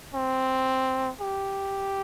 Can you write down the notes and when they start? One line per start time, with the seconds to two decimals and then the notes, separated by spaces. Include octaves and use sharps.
0.14 C4
1.21 G4